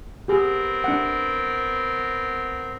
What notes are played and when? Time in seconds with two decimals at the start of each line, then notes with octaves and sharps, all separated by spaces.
0.28 B3 C4 G4 G#4 A#4
0.84 D4 F#5